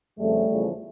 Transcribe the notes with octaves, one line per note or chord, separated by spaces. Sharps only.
F2 C#3 F3 G3 A3
E2 C#3 F3